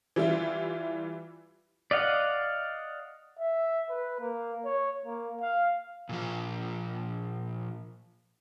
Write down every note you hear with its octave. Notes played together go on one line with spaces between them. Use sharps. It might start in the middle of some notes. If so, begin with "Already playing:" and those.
E3 G3 E4 F4
D5 D#5 F5 F#5
E5
B4
A#3
C#5
A#3
F5
A#2 F3 F4